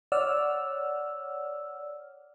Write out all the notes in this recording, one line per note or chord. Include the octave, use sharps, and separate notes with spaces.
C#5 D5 F#5 E6 F6